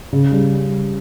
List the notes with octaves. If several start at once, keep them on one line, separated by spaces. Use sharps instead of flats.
C#3
G3